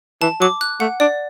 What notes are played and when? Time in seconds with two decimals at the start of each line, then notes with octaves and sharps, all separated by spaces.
0.22 E3 A5
0.41 F#3 D6
0.61 F#6
0.80 A3 F#5
1.00 D4 D5